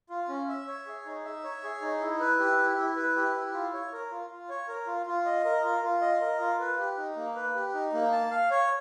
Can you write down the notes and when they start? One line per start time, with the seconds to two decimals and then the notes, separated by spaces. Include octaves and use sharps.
0.10 F4
0.29 C#4
0.49 E5
0.67 C#5
0.86 G#4
1.06 D#4
1.25 E5
1.44 C#5
1.63 G#4
1.82 D#4
2.01 E4
2.20 B4
2.39 G4
2.58 E4
2.77 E4
2.96 B4
3.16 G4
3.35 E4
3.54 F4
3.73 C#5
3.92 A#4
4.11 F4
4.30 F4
4.49 C#5
4.68 A#4
4.87 F4
5.06 F4
5.26 D#5
5.45 A#4
5.64 F4
5.83 F4
6.02 D#5
6.21 A#4
6.40 F4
6.60 B4
6.79 G4
6.97 D#4
7.16 A#3
7.35 B4
7.55 G4
7.74 D#4
7.93 A#3
8.12 A5
8.31 F5
8.51 C#5